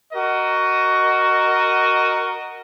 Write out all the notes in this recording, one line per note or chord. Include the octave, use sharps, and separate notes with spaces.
F#4 A#4 D#5